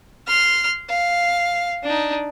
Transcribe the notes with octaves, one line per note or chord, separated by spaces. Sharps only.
C6 F6
F5
D4 D#4